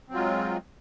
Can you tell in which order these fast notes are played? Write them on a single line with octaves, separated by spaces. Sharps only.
C4 F#3 F4 G#3